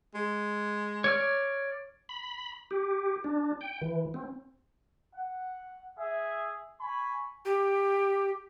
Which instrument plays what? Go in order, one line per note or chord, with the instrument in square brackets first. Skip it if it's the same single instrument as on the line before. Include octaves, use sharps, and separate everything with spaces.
[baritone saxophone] G#3
[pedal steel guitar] C#5 D5 F6
[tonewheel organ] B5
G4
D4
G5
E3
C4
[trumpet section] F#5
G#4 E5
G#5 B5 C#6
[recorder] G4